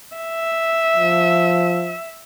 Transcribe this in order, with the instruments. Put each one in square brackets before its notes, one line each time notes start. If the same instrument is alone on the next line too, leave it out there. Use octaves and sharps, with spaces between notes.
[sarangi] E5
[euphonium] F3